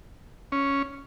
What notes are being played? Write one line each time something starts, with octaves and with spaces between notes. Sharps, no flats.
C#4